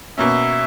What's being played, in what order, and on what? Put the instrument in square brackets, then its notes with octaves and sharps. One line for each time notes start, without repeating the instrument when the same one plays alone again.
[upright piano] B2 A#3 C#4 [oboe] E5